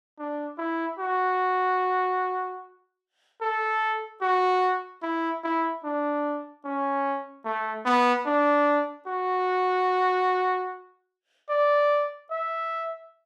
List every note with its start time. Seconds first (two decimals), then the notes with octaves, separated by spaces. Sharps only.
0.19 D4
0.58 E4
0.99 F#4
3.42 A4
4.22 F#4
5.03 E4
5.44 E4
5.84 D4
6.65 C#4
7.45 A3
7.85 B3
8.26 D4
9.07 F#4
11.50 D5
12.31 E5